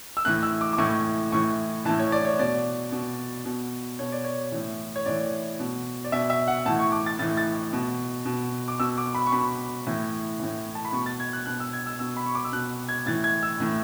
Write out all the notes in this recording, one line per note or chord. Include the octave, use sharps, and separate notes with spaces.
E6
A2 E3 F#6
E6
D6
D6
A2 E3 C#6
A2 E3 C#6
A2 E3 A5
C#5
D5
C#5
B2 D5
B2
B2
B2 C#5
D5
C#5
A2 E3
C#5
A2 E3 D5
B2
D5
B2 E5
E5
F#5
A2 E3 A5
C#6
D6
A6
A2 E3 A6
A6
B2
B2
D6
B2 E6
D6
B5
C#6
B2 B5
A2 E3
A2 E3
A5
B5
B2 C#6
A6
G#6
F#6
B2 F#6
E6
G#6
E6
B2 E6
B5
C#6
D6
E6
B2 F#6
G#6
A2 E3 A6
G#6
E6
A2 E3